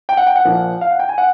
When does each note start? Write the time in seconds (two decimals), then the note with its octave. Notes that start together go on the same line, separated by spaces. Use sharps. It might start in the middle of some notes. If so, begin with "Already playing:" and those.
0.09 G5
0.17 F#5
0.27 G5
0.36 F#5
0.45 A#1 A#2 F3
0.81 F5
0.91 F#5
0.99 G5
1.09 G#5
1.18 F#5